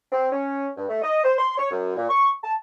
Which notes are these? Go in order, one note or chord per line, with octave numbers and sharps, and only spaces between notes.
C4
C#4
G2
A3
D#5
C5
C6
C#5
F#2
A#2
C#6
A5